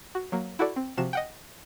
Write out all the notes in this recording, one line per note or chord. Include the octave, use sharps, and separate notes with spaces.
F#4
F#3 A#3
E4 F#4 A4 D5
C4
C3 F3 F#4 E7
D#5 F#5 G5